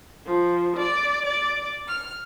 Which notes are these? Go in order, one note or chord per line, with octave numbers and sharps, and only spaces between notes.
F3
D5
D5
F6